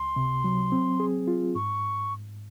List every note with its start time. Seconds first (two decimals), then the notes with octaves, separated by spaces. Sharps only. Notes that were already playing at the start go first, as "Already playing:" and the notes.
Already playing: C#2 C6
0.16 C3
0.44 F#3
0.72 C4
1.00 G#4
1.28 F4
1.55 G#2 C#6